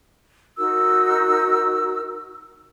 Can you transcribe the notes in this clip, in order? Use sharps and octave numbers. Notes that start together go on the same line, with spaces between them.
D#4 F#4 A#4 E6